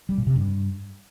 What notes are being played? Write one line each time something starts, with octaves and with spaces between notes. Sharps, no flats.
G3
A#2
C3
G2